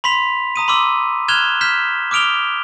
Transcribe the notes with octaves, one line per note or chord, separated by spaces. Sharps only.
B5 C6 B6 F7
A#5 D#6 D#7
B5 C6 D6 E6
F6 F#6 G#6 E7 F7 G7
F6 G6 B6 E7
D6 D#6 F6 D7 F7 G7